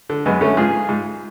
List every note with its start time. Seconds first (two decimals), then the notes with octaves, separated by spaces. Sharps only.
0.09 D3
0.26 F#2 G#3 B3
0.41 D3 A3 C#4
0.57 G#2 F4 G#4
0.89 G#2